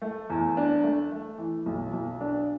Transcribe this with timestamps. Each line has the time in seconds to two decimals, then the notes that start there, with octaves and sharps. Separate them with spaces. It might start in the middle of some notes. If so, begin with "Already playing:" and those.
0.02 A3
0.30 E2
0.57 D4
0.83 A3
1.12 A3
1.38 E3
1.66 B1
1.93 B1
2.21 D4